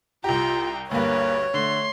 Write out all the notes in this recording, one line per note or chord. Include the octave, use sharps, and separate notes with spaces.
C2 F4 G4 G5 A#5
D2 G2 A#3 B4 C#5
D3 A3 C6